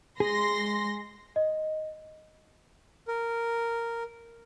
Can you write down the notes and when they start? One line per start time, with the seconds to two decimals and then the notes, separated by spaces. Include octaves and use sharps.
0.20 G#3 G#4 C6 A#6
1.36 D#5
3.08 A#4